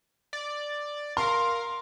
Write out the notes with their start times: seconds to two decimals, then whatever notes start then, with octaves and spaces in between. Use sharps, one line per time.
0.33 D5
1.17 A#4 F5 C6